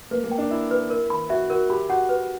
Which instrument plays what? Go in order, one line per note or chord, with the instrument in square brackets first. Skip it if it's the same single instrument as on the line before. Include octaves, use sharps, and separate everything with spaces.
[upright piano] A#3 [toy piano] B4
[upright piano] A#3
[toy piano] G5
[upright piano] D4
[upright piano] E4 [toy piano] E5
[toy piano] B4
A#4
B5
[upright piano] F#4 [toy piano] E5
[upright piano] F#4 [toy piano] A#4
[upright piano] G4 [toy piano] B5
[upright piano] F#4 [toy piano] F#5
[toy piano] B4